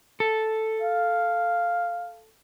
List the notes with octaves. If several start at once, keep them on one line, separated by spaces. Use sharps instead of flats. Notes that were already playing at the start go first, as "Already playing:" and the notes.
A4
F5